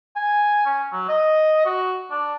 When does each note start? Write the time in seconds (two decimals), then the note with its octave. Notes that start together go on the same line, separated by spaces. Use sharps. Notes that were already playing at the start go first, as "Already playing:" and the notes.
0.16 G#5
0.66 C#4
0.92 F#3
1.09 D#5
1.66 F#4
2.11 D4